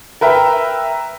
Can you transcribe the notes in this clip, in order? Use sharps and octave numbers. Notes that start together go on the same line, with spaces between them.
A#4 B4 E5 G5 A#5